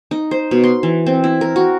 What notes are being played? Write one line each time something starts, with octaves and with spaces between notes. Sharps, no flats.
D#4
C5
B2
C6
E3
C4
E4
A#4
F#4